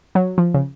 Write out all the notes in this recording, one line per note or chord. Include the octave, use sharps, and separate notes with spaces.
F#3
F3
C#3